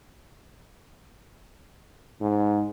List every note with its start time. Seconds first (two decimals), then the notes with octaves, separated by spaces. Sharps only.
2.21 G#2